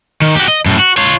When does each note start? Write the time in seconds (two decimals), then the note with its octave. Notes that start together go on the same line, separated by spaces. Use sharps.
0.22 D#3
0.35 F#4 G4
0.48 D#5
0.66 F#2 A2
0.79 F#4
0.97 F4 C#5